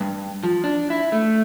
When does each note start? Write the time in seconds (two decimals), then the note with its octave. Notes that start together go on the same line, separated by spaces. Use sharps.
0.01 G2
0.43 F3
0.64 D4
0.90 E4
1.12 A3